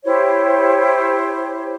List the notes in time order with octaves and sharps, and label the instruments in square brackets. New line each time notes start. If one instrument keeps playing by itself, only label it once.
[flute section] E4 G4 C5 C#5